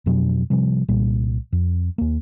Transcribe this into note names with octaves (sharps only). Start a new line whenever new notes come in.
F2 B2 F#3 D4
C3 F3 G3
C2 A#2 G3
F2
D#2 A#3